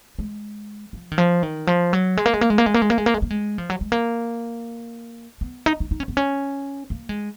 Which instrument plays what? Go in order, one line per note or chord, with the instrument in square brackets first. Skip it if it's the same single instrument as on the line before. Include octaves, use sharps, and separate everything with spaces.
[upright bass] G#3
F3
D#3
F3
D#3
F3
F#3
G#3
A#3
G#3
A#3
G#3
A#3
G#3
A#3
G#3
A#3
G#3
A#3
G#3
A#3
G#3
F3
F#3
G#3
A#3
B3
D#4
D#4
D#4
C#4
B3
C#4
A#3
G#3